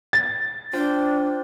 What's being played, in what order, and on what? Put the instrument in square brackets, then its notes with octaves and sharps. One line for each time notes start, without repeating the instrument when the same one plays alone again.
[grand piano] A6
[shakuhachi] D4 [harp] F4 C5 G5